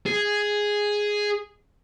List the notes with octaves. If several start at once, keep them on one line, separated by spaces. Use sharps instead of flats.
G#4